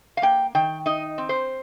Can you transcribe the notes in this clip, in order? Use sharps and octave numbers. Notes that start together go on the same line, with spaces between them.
F5
A#3 G5
D#3 G5
D#4 D#5
C4
C5